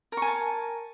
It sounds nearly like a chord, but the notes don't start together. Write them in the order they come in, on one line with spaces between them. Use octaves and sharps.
A#4 C#6 G#5 A5